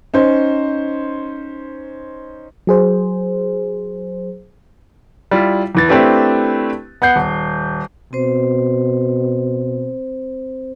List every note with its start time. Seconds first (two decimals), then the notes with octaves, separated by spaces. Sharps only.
0.14 C#4 D#4 C5
2.67 F#3 G#4 C5
5.31 G3 E4 F4
5.75 E2 E3 A6
5.89 A3 C4 D4 E4 G4 B4
7.02 B3 F#5 G6 C7
7.16 D#1
8.13 B2 C4 C5